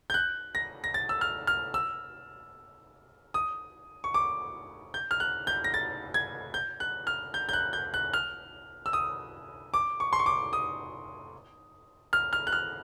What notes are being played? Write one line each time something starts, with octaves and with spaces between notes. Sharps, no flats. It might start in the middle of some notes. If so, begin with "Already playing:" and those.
G6
F#6
A#6
A#6
A6
E6
F6
F6
E6
D#6
C#6
D6
G6
F6
F#6
G6
A#6
A6
G#6
G6
F#6
F6
G6
G6
F#6
G6
F#6
F6
E6
D#6
D6
C#6
C6
C#6
D6
D#6
F6
F6
F#6
F6